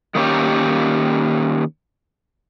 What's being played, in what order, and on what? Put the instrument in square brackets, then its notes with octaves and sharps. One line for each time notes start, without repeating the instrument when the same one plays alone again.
[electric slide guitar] D#3 A#3 C#4 G4